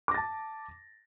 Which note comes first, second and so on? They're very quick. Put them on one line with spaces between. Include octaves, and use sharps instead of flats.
D6 A#6 A6 A5